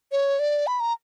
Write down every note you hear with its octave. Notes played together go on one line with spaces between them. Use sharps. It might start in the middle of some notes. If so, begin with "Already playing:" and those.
C#5
D5
B5
A#5